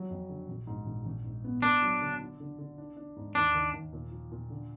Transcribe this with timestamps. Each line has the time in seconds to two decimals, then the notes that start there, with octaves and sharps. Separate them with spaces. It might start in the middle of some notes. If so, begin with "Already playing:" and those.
Already playing: F3 F#3
0.10 F2
0.29 D3
0.48 A#1
0.67 G#2
0.86 A#1
1.05 A#1
1.24 G#2
1.44 B3
1.62 A#3 D4
1.82 F#3
2.01 D3
2.20 D4
2.40 D3
2.59 D3
2.78 D4
2.97 D4
3.16 G#2
3.35 D#2 D4
3.55 D#3
3.73 D#2
3.93 A#2
4.11 F3
4.32 A#2
4.50 D3